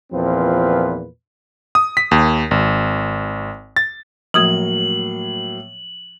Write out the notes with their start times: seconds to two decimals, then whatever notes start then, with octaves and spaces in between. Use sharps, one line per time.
0.13 E2 A#2 F3 C4 F4 B4
1.75 D#6
1.97 B6
2.11 D#2
2.51 G#1
3.76 A6
4.34 A2 F3 F#3 A#3 D#6 G#6 F#7